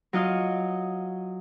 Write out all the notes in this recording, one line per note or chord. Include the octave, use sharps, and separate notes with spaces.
F#3 F4 D#5 F5